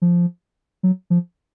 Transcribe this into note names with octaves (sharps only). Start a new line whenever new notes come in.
F3
F#3
F3